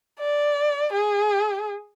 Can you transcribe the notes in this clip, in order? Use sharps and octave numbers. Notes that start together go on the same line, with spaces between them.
D5
G#4